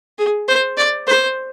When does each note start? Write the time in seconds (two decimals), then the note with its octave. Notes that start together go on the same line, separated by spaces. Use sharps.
0.19 G#4
0.48 C5
0.78 D5
1.07 C5